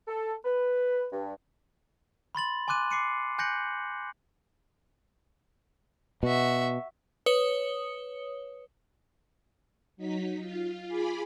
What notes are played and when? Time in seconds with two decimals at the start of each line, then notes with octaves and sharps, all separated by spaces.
0.08 A4
0.45 B4
1.12 G2
2.35 B5 C6 A6 F#7
2.68 G#5 C6 D6 F#6 D#7
2.91 D6 C7 C#7 D#7
3.39 G#5 F#6 G6 A#6 C#7 F#7
6.23 B2 F#4 E5
7.26 B4 C#5 D#6 C#7 G7
9.97 F#3 D#4 B6
10.39 F4
10.88 F4 G#4 G#5 B5 D6